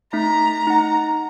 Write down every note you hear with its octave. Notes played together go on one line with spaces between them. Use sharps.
A3 D#4 A#5 B6
D#4 F#5